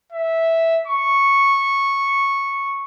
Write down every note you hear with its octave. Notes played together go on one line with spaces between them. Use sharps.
E5
C#6